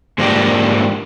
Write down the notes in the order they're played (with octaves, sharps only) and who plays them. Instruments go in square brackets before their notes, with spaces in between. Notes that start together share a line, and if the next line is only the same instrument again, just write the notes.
[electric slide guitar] G#2 F3 A#3 D4 G4